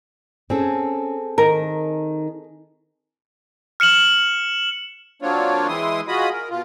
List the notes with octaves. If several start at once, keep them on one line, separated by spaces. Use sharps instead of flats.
C4 C#4 G#4 A4
D#3 A#4
F6 C#7 E7 F#7
F#3 A#3 C4 D4 F4 C#5
E3 G#3 E4 C6 D#6
F4 F#4 G#4 D#5 B5 D#6
A#4
B2 F4